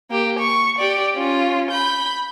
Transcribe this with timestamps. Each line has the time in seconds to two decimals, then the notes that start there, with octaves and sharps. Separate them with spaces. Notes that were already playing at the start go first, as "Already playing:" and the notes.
0.11 A#3 G4
0.40 C#6
0.79 G4 D5
1.15 C#4 F4
1.71 B5 G6